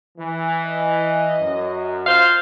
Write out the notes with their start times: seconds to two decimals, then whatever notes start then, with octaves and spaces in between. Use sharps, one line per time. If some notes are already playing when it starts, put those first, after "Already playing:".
0.18 E3
0.68 D#5
1.39 F#2
2.07 F4 C5 F5